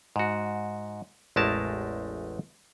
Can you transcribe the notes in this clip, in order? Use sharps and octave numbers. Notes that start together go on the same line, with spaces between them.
G#2 F#4
A1 E2 G#3 A3 A#4 A5